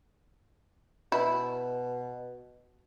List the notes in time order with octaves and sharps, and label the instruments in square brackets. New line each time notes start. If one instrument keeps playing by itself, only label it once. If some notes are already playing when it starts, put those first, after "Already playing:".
[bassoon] B2 [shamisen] E4